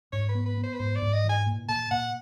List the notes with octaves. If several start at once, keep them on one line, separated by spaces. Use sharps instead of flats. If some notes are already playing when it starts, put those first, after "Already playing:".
G#2 C#5
B4
B3
B4
B3
C5
B4
G#2 C5
D5
G#2
D#5
E3
G#5
A#2
A#2 A5
A#2 F#5